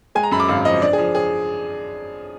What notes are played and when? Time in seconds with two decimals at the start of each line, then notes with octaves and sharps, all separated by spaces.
0.15 G#3 G#5
0.23 A#5
0.31 F#2 B5
0.40 D6
0.49 G#1 F5
0.65 F3 D#5
0.82 D4 D5
0.93 G#4
0.98 F3
1.15 G#4